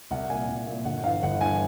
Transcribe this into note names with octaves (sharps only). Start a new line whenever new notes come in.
C2 F#5
A#2 G#5
C2
A#2
G1 F#5
G2 E3 F5
G1 F#5
G2 E3 G#5